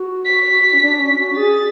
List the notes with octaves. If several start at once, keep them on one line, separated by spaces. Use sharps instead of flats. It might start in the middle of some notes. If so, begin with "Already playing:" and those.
Already playing: F#4
B6
C#4
D4
C#4
F#4
G#4 A6